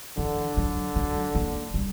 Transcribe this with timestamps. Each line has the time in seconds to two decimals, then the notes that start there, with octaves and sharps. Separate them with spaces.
0.18 D3 E3
0.57 F#3
0.96 F#3
1.35 A#3
1.74 G3